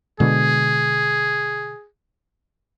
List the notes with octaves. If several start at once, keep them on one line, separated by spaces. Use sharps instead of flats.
B2 D3 G#3 G#4